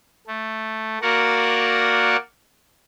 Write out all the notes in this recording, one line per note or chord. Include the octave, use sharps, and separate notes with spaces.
A3
A#3 F#4 A#4 D5 F#5